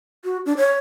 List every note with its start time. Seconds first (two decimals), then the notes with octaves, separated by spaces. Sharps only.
0.25 F#4
0.46 D4
0.57 C#5